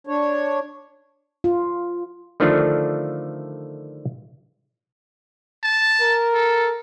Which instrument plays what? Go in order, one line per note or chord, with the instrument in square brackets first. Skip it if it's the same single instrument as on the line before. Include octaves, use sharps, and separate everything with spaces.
[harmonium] D4 C#5
[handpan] F4
[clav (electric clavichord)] D3 D#3 F3 A3 D4 F4
[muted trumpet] A5
[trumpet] A#4
[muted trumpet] A4